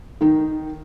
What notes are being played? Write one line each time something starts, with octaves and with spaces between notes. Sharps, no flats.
D#3 D#4